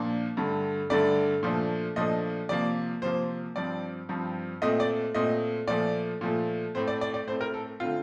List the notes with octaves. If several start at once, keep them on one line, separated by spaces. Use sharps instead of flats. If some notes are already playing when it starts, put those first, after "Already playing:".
Already playing: A#2 F3 A#3 D4
G2 D3 A3
G2 D3 A3 D5
A#2 F3 A3 D4
A#2 F3 A3 D4 D#5
C3 F3 A#3 D5
C3 F3 A#3 C5
G2 F3 C4 D5
G2 F3 C4
A#2 A3 C4 D#5
D5
A#2 A3 C4 D#5
A#2 F3 A3 D5
A#2 F3 A3
A2 A3 C4 C5
D5
D5
D5
A2 A3 C4 C5
A#4
A4
D3 A3 C4 F4